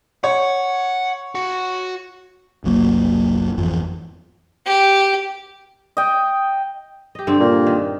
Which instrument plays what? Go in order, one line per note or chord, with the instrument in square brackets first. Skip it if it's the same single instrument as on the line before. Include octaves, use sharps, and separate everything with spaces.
[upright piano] C#5 [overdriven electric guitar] F#5
[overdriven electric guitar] F#4
[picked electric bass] F#1 C2 F#3 A#3
G#1 F2 E3 F3
[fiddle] G4
[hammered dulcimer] D#5 G5
[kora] G4 D#5
G2 D3 C4
[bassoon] A#2
[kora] D#3